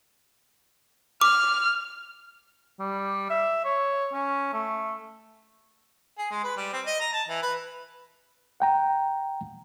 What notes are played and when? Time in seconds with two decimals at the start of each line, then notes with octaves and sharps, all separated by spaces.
1.21 D6 F6
2.79 G3
3.30 E5
3.65 C#5
4.13 C#4
4.53 A3
6.18 G#4
6.31 G#3
6.44 B4
6.57 G3
6.73 C4
6.86 D#5
7.00 A#5
7.13 A5
7.29 E3
7.43 B4
8.60 F#5 G5 A#5